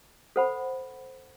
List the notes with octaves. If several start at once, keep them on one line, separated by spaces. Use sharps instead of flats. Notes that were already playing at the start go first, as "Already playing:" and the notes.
A4 C5 F#5 B5